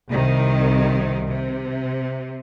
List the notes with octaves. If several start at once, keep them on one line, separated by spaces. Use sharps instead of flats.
C2 C3 D#3
C3